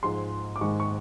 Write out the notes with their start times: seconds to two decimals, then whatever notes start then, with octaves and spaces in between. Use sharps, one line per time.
0.03 G#2 F3 G#3 C6
0.56 D6
0.61 G#2 D#3 G#3 C#6
0.80 C#6